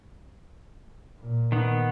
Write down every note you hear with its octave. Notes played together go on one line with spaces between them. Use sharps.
A#2
D#3 B3